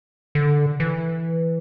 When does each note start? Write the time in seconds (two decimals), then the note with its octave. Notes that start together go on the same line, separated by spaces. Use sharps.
0.35 D3
0.80 E3